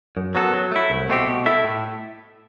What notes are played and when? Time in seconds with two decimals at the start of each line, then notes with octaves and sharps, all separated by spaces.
0.17 F#2
0.35 F#3 B3 F#4 A4
0.53 F#3
0.72 A3 E4
0.90 C2
1.09 B2 A3 C4 G4
1.28 B2
1.46 A3 E4 A4 E5
1.64 A2